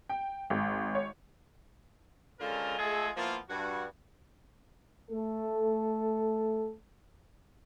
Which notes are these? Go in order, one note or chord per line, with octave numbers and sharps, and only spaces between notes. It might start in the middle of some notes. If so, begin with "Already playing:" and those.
G5
G#1
C#5
D3 G#3 C#4 F4 A4 A#4
G#3 A3 F4 G#4 A4
F3 A#3 B3 E4 F4
G2 F#4
A3 A4